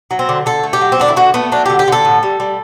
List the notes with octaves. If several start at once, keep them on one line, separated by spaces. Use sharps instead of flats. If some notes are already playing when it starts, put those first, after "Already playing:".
F#3
C4
D3
D3 A4
A3
G4
F#3
C4
D3 D4
E4
D3 F#4
A3 B3
F#3 D4
D3 G4
G4
D3 A4
A2
G3
G3